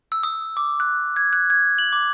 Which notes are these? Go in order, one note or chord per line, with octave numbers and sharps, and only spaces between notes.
E6
D#6
D6
F#6
G#6
F#6
G#6
F#7
D6